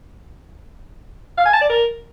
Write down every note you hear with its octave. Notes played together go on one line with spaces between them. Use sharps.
F5
G#5
A5
D5
A#4